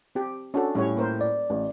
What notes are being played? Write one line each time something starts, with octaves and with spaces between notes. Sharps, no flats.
C4 G4
C#4 D4 F#4 A4
A2 G3 C#4 C#5
A#3 A#4 C5
D5
A1